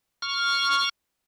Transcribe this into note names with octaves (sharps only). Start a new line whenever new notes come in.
C#6 F6